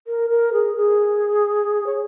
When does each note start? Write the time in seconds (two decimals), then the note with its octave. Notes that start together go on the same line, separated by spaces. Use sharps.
0.07 A#4
0.30 A#4
0.53 G#4
0.76 G#4
1.86 C#5